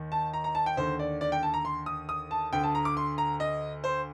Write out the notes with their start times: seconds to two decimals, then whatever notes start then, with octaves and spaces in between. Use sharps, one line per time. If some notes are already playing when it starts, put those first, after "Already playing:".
Already playing: D#2 D#3
0.12 A5
0.34 A#5
0.44 A#5
0.55 A5
0.66 G5
0.77 D#2 D3 C5
0.99 D5
1.21 D5
1.32 G5
1.43 A5
1.54 A#5
1.65 C6
1.86 D#6
2.09 D#6
2.31 A5
2.53 D2 D3 G5
2.63 A5
2.75 A#5
2.85 D6
2.97 C6
3.18 A#5
3.40 D#5
3.84 C5